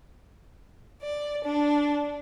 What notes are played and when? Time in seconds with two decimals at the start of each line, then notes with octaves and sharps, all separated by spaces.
1.02 D5
1.44 D4